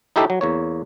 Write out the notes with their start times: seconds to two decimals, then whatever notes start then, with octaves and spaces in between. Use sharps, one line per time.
0.16 D#4 E4 G4 A4
0.30 F#3
0.41 E2 A#3 C#5